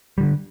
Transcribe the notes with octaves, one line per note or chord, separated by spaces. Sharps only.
D3 D#3 G3